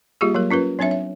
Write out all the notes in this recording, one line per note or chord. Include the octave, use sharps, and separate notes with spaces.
G3 A#3 F4 G4 G#4
F#3 A#3 A#4
C#4 F4 A#4 B4
F#3 C4 D4 C#5 E5
E5